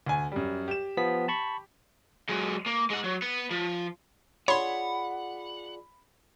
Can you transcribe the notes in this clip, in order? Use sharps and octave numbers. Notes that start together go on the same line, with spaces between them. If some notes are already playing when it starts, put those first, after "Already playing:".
D2 G#5
F#2 G3
G4 E7
F3 B3 B6
A5 B5 C#6
F#3 G#3
A#3
G#3 F#5
F#3
B3
F3
F4 G#4 C#5 D5 F#5 B5 C6